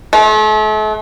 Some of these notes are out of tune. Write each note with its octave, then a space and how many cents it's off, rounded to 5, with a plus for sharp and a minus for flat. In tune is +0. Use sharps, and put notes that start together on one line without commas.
A3 -40